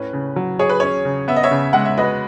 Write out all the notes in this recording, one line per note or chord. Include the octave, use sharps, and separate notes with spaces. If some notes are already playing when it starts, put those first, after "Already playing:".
Already playing: A2 C#4 B4
C#3
F#3
G#4 C#5
B4
C#4 C#5
C#3
B3 E5
D#5
C#5 E5
C#3
G#3 F#5
E5
F#4 B4 D#5